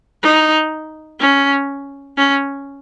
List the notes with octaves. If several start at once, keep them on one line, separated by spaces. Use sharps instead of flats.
D#4
C#4
C#4